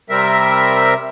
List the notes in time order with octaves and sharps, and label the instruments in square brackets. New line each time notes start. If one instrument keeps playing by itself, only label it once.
[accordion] C3 G3 C4 A#4 E5